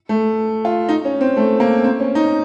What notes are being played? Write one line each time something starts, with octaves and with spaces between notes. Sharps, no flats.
A3
F4
D#4
C#4
C4
A3
A#3
C4
C#4
D#4